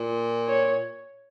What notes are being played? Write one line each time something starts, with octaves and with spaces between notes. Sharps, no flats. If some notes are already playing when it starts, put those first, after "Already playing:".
Already playing: A#2
C#5